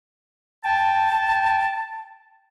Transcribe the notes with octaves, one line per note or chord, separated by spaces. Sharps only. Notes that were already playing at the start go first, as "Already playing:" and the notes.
G5 A5